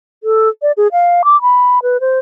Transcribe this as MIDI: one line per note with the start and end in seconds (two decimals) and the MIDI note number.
0.23 0.49 69
0.62 0.72 74
0.77 0.88 68
0.92 1.22 77
1.25 1.40 86
1.42 1.79 83
1.83 2.00 71
2.01 2.19 72